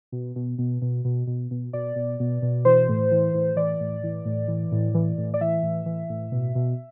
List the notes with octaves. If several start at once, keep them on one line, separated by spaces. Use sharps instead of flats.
B2
B2
B2
B2
B2
B2
B2
B2 D5
B2
B2
B2
E3 C5
A2
E3
A2
E3 D5
A2
E3
A2
E3
A2
E3
A2
D5
E3 E5
A2
E3
A2
B2
B2